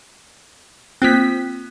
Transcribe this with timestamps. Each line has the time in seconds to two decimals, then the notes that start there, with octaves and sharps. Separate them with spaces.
1.02 A#3 C4 F4 F#6 B6